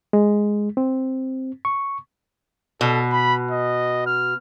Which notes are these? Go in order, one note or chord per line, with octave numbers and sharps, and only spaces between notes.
G#3
C4
C#6
B2 A4
B5
D#5
F6